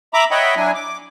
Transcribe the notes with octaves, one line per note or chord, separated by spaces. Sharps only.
E5 A#5 B5 D6
C#5 D#5 E5 F#5 G5 B5
F#3 D4 E4 G#5
D6